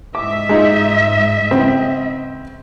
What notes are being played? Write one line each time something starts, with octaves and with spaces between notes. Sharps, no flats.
G#2 D#5 E5 D6
G#3 D#4 F4
C#3 B3 C4